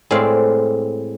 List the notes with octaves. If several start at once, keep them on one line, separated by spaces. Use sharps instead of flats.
A2 G#3 C4 G#4 D5 F5